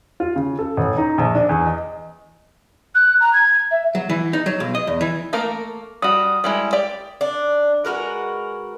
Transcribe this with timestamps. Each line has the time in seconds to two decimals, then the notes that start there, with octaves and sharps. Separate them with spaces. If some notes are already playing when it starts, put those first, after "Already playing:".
0.20 F4
0.36 C#3
0.59 A4
0.77 A1
0.98 D#4
1.18 A#1
1.35 D4
1.49 E2
1.66 D#5
2.95 F#6
3.21 A#5
3.33 G#6
3.71 E5
3.95 F#3
4.09 E3
4.33 D#4
4.46 F#3
4.60 B1
4.75 D#5
4.87 E2
5.01 E3
5.33 A3 A#3 A#4
6.02 G3 F#4 D#6
6.44 G3 G#3 E4
6.73 G4 D5
7.21 D4
7.85 G#3 F#4 A#4 B4